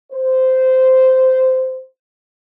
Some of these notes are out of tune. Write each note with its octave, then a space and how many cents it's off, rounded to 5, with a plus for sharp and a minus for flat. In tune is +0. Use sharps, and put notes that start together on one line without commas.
C5 -10